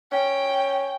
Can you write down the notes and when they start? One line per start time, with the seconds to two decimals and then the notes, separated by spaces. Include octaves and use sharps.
0.12 C#4 G5